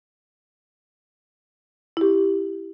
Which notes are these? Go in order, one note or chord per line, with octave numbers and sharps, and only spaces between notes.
E4 G4